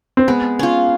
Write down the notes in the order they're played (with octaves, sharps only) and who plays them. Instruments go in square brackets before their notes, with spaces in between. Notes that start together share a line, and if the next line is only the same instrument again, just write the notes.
[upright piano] C4
[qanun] G#3 [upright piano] B3
[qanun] C#4 F4